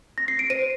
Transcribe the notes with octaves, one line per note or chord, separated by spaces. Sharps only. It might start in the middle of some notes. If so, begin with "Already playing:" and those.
A#6
C7
D7
C5 D#7